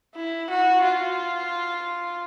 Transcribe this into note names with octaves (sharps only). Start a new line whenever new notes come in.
E4
F#4
F4